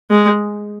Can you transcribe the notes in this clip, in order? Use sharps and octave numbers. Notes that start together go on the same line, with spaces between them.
G#3